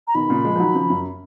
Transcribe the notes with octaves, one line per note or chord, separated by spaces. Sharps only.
A#5
B2 D#3 B5
A#2 C#3
F3 G#3
F3
D#3 F#3
C#3 F3
F#2